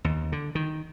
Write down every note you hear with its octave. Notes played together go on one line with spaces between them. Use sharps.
D#2
D3
D#3